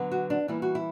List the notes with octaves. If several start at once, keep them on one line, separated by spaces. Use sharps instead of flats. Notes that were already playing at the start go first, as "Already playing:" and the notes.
Already playing: D3 F#3 B3
F#4
D4
E3 G3 A#3 E4
F#4
E4